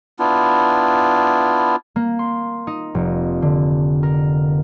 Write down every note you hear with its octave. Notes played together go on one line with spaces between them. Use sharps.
B3 D4 E4 F4
A#3
C6
D#4
F1
D3
A#4